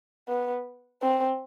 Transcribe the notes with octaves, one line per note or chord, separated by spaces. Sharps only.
B3
C4